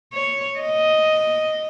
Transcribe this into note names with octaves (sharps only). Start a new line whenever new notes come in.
C#5
D#5